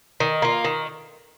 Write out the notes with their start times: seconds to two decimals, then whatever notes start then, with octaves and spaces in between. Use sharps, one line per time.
0.20 D#3
0.42 A#3 F4
0.64 D#3